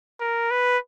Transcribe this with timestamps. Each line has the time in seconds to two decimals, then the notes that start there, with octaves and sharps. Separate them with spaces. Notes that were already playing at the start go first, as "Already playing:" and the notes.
0.20 A#4
0.51 B4